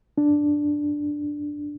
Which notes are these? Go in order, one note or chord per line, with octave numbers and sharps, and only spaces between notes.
D4